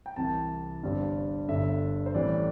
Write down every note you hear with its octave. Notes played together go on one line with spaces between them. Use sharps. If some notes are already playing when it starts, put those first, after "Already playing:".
G5
C2 C3 E3 A5
G1 G2 G3 C4
G1 G2 D3 E5
C5
A1 A2 E3 G3 C4 D5